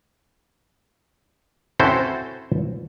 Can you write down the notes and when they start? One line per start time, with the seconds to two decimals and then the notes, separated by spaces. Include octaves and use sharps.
1.80 C4 C#4 E4 F#4 A4 C5